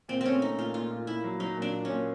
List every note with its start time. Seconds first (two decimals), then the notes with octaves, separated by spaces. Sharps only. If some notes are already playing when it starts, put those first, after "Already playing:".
0.08 A#2 C4
0.21 A3 C4 C#4
0.42 A3 D#4
0.58 A#2 F4
0.74 A#2 F4
0.91 A#2
1.07 A#2 E4
1.24 F#3
1.40 F#3 D#4
1.56 A#2
1.62 D4
1.73 A#2
1.85 C#4
1.90 A#2